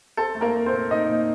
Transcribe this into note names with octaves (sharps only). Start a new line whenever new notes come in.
C4 A4
A3
A#3 A#4
A3
C4 C5
A#2
A#2 D#4 D#5
A#2